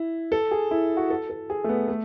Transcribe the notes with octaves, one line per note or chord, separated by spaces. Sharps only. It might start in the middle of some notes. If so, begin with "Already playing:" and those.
Already playing: E4
A4
G#4
E4
F#4
A4
A4
G#4
A3
B3
A3